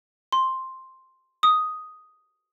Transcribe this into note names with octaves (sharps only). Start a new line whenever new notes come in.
C6
D#6